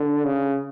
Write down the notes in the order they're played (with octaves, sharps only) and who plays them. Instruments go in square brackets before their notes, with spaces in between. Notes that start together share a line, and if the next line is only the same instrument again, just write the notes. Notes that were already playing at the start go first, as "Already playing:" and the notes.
Already playing: [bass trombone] D3
C#3